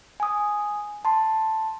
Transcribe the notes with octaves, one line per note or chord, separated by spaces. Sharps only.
G#5 D#6
A5 C6